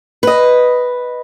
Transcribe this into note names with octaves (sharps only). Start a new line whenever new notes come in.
B4 D#5